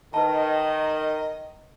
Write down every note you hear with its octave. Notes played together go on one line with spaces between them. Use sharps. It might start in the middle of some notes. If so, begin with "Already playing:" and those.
D#3 B4 D#5 A5